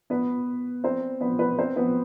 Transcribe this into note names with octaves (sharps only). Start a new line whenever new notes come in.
B3 B4
C4 C5
B3 B4
B3 B4
C4 C5
B3 B4